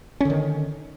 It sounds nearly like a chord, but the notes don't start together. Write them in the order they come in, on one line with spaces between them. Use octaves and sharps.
C#4 D3 D#3